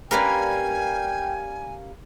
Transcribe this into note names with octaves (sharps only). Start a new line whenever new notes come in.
G3 A#3 C#4 A#4 B4 D5 G5 G#5